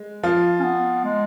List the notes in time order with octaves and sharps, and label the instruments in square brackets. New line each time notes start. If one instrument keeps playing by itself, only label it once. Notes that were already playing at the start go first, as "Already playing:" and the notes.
Already playing: [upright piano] G#3
F3 F4
[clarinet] C#4
B3
G#3